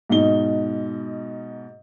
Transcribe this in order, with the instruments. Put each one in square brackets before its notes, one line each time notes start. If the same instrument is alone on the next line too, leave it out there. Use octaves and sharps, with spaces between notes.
[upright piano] G#2 B2 D#4 G7